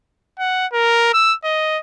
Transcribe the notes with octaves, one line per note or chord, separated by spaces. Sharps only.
F#5
A#4
E6
D#5